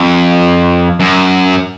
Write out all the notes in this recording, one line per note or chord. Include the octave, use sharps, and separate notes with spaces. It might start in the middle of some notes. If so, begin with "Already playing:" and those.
Already playing: F2
F#2